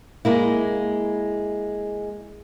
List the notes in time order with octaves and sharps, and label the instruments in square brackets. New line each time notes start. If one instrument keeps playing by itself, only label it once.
[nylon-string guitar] G#3 A#3 E4